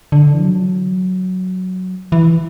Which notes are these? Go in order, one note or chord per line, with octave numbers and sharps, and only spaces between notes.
D3
E3
F#3
E3